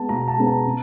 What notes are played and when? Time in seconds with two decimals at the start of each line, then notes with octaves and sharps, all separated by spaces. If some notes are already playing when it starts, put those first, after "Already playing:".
Already playing: G#3 B3 A5
0.09 B2 A#5
0.28 A5
0.37 G#3 B3
0.46 A5
0.65 C3